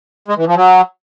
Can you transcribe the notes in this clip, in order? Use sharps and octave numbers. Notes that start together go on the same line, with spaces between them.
G#3
E3
F3
F#3